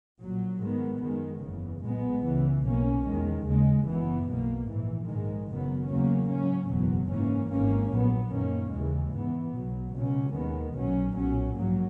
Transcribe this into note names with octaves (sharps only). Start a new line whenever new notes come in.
A#1 A#2 F#3
G#2 D#3 G#3 B3
F#2 D#3 G#3
F#1 E2 C#3
B1 A#2 G#3 B3
C#2 C#3 E3
B1 B2 A#3 C#4
E2 D#3 G#3
D#2 C#3 G#3
F#1 F#2 E3 B3
B1 B2 A#3
A#1 G#2 E3
A#1 G#2 D#3 G#3
F#1 F#2 D#3 F#3 B3
E2 C#3 F#3 A#3 C#4
G#2 F#3 C#4
F#1 E2 B2 F#3
G#2 E3 A#3 C#4
G#1 G#2 E3 A#3 C#4
A#1 A#2 F#3 B3
F#2 D#3 A#3 C#4
D#2 C#3 E3 G#3
G#2 E3 B3
B1 B2 F#3
C#2 B2 F#3 C#4
D#2 D#3 G#3 B3
B1 A#2 F#3 C#4
B1 A#2 F#3 C#4
A#1 G#2 F#3 A#3